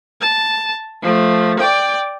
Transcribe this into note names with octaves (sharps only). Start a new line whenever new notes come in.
A5
F3 A3
D5 G5